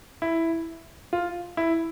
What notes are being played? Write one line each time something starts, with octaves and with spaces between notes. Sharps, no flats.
E4
F4
E4